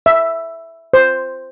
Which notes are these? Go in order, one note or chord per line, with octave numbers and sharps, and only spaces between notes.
E5
C5